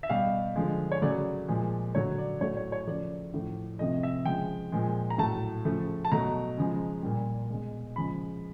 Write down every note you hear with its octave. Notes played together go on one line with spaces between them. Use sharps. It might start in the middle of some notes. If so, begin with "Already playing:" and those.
E5
B2 G3 F5
D3 F3 G#3
C#5
C#3 F#3 A3 D5
A#2 F3 G#3
D3 F#3 A3 C#5
D5
A2 F#3 A3 C#5
C#5
C#5
C#3 F3 A3 D5
A2 F3 A3
C3 F3 A3 D#5
E5
C#3 F3 G#3 G5
A#2 F3 G#3
A#5
A2 F#3 A3 A5
C#3 F3 A3
A5
B2 F#3 A3 A#5
C#3 F3 G#3
A#2 G3
B2 G#3
C#3 F3 G#3 B5